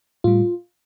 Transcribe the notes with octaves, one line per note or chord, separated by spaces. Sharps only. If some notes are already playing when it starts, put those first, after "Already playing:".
A2 G3 F4